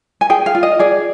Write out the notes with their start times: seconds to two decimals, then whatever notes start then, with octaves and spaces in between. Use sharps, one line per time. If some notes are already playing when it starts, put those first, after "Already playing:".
0.21 G#5
0.30 G#4 G5
0.46 F5
0.55 F4
0.63 D#5
0.79 G#4 D5